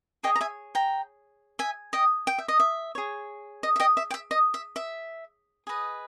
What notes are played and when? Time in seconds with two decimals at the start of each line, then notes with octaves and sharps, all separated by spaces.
0.23 G#4 C#5 D#5 G5
0.35 A#5
0.41 E5 G#5
0.75 G5 A#5
1.59 E5 G#5
1.93 D#5 G5
2.27 G5
2.38 E5
2.48 D#5
2.60 E5
2.95 G#4 C#5
3.63 D#5
3.76 E5
3.80 D#5 G5
3.97 E5
4.11 G5
4.14 E5
4.31 D#5
4.54 E5
4.76 E5
5.67 G#4 B4 D#5